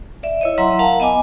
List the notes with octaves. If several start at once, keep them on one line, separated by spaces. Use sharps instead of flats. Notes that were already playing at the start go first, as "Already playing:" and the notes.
D5 E5
E4 C#5 D#5
F#3 E4 E5 F#5 A#5 C6
A#4 F5 F#5 A5 A#5
B3 D#5 G#5 D6